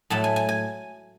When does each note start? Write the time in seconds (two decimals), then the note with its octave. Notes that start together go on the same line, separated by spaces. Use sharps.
0.10 A2 F#3 A3 A5
0.24 G#5
0.36 G#5
0.49 G#5